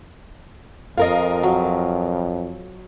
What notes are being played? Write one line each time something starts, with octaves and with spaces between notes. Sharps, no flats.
F2 F4 A#4 D#5
F#3